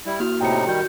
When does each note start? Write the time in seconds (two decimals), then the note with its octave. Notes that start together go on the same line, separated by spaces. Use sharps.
0.06 G3 E4
0.20 A#3 E4 F#4 F6
0.41 A2 C3 D#4 G5 C#7
0.67 D#3 G3 F#4 G6